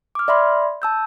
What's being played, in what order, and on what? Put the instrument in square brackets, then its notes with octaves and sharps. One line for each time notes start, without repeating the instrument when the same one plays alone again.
[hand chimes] D6 F6
D5 E5 B5 C6
A5 E6 G6